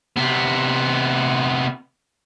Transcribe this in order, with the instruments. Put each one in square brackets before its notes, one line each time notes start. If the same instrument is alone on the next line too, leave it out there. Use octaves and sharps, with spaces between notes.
[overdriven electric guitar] C3 B3